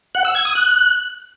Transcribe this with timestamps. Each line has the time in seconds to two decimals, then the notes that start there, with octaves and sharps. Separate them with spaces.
0.15 F#5
0.25 E6
0.35 G#6
0.45 D#6
0.55 F#6